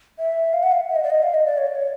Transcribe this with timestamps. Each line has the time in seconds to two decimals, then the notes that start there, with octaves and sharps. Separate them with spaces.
0.18 E5
0.53 F5
0.63 F#5
0.71 F5
0.89 E5
0.95 D#5
1.03 D5
1.10 D#5
1.22 F5
1.34 D#5
1.46 D5
1.58 C#5
1.66 D5
1.75 C#5